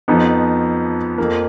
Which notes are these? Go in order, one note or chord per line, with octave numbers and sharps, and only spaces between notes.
F2 F3 B3 D#4
F2 F3 A#3